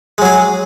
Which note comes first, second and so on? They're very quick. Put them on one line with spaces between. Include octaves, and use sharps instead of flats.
G#3 F#3 G#4